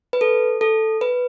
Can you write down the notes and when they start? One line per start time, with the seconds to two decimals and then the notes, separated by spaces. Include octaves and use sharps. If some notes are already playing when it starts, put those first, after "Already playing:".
0.13 B4
0.21 A4
0.61 A4
1.01 B4